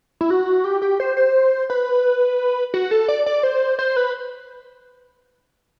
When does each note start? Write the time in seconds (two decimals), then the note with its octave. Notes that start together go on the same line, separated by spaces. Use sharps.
0.21 E4
0.30 F#4
0.64 G4
0.82 G4
1.00 C5
1.17 C5
1.70 B4
2.74 F#4
2.91 A4
3.08 D5
3.26 D5
3.43 C5
3.79 C5
3.96 B4